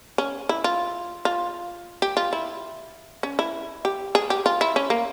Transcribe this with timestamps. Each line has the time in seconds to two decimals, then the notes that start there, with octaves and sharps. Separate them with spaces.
0.18 C#4
0.49 E4
0.64 F4
1.25 F4
2.02 G4
2.17 F4
2.33 E4
3.23 C#4
3.39 E4
3.85 G4
4.15 G#4
4.30 G4
4.46 F4
4.61 E4
4.76 C#4
4.90 A#3